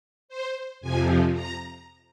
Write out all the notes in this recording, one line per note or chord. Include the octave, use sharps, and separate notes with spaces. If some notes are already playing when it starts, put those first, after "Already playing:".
C5
F2 C3 F3 G#5
A#5